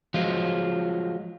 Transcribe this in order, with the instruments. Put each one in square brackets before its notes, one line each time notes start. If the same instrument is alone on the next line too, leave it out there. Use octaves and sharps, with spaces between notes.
[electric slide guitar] F3 F#3 G#3 F4